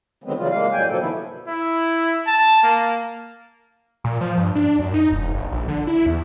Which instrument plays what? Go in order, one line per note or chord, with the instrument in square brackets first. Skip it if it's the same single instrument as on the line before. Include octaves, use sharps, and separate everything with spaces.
[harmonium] D3 D#3 F#3 G#3 B3 C4
C#3 E3 F#3 G3 F4
G#3 A#3 F5
F#2 A2 F#3 G3 G5 G#5
B2 D3 F3 F#3 A#3 A4
C3 D#3 B3 E4
[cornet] E4
A5
A#3
[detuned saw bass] A#2
F3
G2
D4
F#2
D#4
E1
G1
A#1
D3
E4
E2